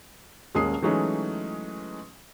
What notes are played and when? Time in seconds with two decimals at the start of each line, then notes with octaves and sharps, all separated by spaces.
0.55 D#1 G#3 A#3 C#4 D#6 C7
0.82 E3 F#3 G#3 A3 C#4 D#4